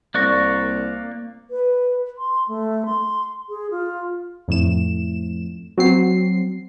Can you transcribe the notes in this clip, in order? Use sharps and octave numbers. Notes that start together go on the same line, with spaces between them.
C2 A#3 D5 C#6 F#6 A#6
B4
C6
A3
C6
G#4
F4
F2 A2 E7
F#3 C4 C7